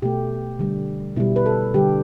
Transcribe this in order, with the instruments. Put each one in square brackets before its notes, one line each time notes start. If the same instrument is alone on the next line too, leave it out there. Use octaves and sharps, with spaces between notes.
[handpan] B2 A3 G4
D3 G3
B2 G3 E4
B4
A4
D3 G3 G4